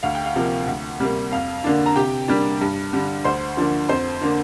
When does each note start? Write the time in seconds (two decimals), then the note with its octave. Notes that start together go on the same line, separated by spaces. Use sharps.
0.03 D2 F5
0.15 G5
0.26 F5
0.35 C3 F3 A#3
0.67 D2
0.99 C3 G3 A#3
1.32 F2 F5
1.64 D3 A#3 D4
1.86 A#5
1.96 C3 G4 G5
2.28 G3 A#3 D4
2.61 G2
2.93 D3 G3
3.24 D2 C5 C6
3.57 D3 F3 A#3 D4
3.89 F2 C5 C6
4.21 D3 A#3 D4